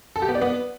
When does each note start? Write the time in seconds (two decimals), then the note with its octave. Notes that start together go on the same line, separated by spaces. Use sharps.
0.16 A4
0.22 G4
0.29 B3
0.35 D5
0.41 B3